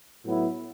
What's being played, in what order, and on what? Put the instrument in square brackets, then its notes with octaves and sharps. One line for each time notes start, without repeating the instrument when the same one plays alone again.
[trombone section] A2 F#3 B3 E4